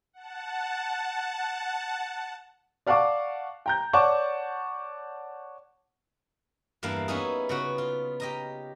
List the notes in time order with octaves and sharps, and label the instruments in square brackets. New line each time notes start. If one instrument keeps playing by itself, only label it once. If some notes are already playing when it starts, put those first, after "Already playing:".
[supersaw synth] F#5 A5
[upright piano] D5 F5 F#5 A5 C#6 D6
G5 A#5 G6
C#5 D5 F#5 A5 C#6 D6
[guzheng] E2 G2 A#3 E4 F5
B3 C#4 D#4 E4 G#4
C#3 B3 F#4
F4
G4 D#5 A#5